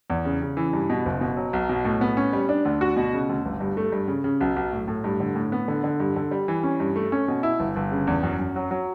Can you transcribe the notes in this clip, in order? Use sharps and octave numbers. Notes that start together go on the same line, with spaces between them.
E2
C#3
C#3
E3
G2
B2
F#1
B2
F#3
B1
B2
A2
B3
C#4
G3
D4
D2
F#4
B2
C#3
D2
G1
G2
A3
G2
C#3
C#3
B1
B1
A2
A2
G2
D3
A2
B3
D3
D3
G2
D3
G3
E3
C#4
G2
A3
C#4
B2
E4
G1
G1
C#3
E2
F#2
F#2
F#3
F#3